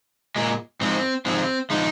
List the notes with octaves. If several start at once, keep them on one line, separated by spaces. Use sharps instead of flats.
A#2 G#3
G#2 F3 G#3 C4
G#2 F3 G#3 C4
F3 G#3 D#4